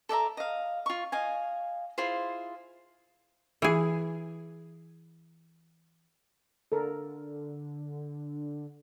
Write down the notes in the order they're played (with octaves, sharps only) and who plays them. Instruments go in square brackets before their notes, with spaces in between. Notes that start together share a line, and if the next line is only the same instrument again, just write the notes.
[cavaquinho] A4 D5 E5 A#5
D#5 F5
F4 C#6
D#5 F5 G#5
E4 F4 G#4 C5
[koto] E3 G#4
[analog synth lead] D3 [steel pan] A4 A#4